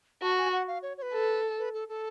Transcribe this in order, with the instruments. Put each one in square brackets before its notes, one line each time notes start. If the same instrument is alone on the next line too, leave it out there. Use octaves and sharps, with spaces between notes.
[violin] F#4 [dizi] A5
[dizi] G#5
F#5
F5
C#5
C#5
B4
[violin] A4
[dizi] B4
A4
A4